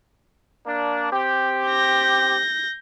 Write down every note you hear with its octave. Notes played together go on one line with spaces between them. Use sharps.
A#3 D4
C4 G4
G6 A#6